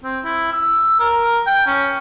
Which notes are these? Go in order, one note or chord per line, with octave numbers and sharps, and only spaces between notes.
C4
E4
E6
A#4
G5
C#4